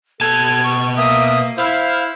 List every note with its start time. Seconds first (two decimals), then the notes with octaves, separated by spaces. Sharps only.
0.21 B2 A4 A5 G#6
0.64 C#6
0.97 A#3 E5 D#6
1.58 E4 C5 F5